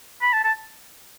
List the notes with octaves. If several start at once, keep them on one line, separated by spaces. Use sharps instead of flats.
B5
A5
A5